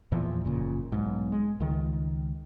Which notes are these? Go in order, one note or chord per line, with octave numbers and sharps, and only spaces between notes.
E2 A#2 E3 F3
F#1 A#2 C#3
B1 G#2
G#3
C#2 D#3